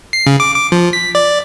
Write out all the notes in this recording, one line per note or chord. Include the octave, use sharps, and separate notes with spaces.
C7
C#3
D6
D6
F3
B6
D5